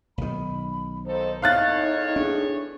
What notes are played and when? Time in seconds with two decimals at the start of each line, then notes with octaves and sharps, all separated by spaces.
0.18 B1 D#3 B5
1.05 D#2 D#4 A4 C5
1.42 E2 A2 D#4 C#5 F5 F#6 A6
2.16 D4 G#4